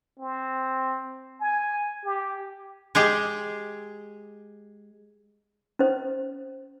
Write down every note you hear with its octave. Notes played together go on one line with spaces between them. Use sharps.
C4
G#5
G4
G#3 G4 G#4
C#4 C5